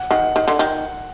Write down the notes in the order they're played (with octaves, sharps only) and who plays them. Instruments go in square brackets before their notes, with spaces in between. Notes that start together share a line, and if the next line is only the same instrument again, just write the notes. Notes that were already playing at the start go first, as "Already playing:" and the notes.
Already playing: [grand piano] F#5
[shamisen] D#3 [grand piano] F#5
[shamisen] D#3
D3
D#3